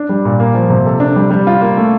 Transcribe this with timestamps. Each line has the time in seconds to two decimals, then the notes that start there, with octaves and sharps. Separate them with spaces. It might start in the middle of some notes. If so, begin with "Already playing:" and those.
Already playing: D4
0.09 G3
0.25 A#2
0.40 A#3
0.55 F3
0.70 C3
0.86 A4
1.00 D4
1.16 G3
1.31 G3
1.47 F4
1.61 A#3
1.77 A3